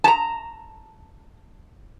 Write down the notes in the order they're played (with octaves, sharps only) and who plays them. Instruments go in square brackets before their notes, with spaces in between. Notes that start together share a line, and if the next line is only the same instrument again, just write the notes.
[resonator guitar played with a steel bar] A5 A#5